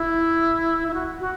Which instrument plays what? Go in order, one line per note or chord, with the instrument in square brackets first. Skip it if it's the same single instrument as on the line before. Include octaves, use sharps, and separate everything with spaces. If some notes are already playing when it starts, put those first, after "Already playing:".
Already playing: [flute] E4
E4
F#4
F#4